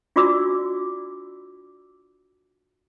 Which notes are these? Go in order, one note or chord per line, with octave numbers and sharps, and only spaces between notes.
D4 F4 F#4 D5 D6 E6